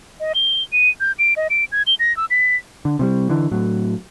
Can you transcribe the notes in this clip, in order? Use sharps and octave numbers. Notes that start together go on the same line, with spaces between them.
D#5
G7
D#7
G6
D7
D#5
D7
G#6
G7
A#6
E6
B6
D3
C3 F3 G3
D3 E3
A2 F#3